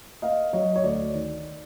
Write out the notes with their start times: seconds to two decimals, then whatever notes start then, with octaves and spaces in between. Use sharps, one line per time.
0.22 A#3 D#5 F5
0.53 F#3 C#5 D#5
0.76 C#5
0.84 D2 D5
1.15 D#3